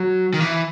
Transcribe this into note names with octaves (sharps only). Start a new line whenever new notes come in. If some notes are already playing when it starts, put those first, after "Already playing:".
Already playing: F#3
D#3
E3